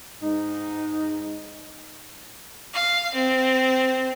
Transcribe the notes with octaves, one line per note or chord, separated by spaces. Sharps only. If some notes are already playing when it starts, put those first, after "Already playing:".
G#2 D#4
F5
C4